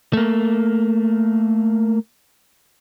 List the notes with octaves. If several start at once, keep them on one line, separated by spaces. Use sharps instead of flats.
A3 A#3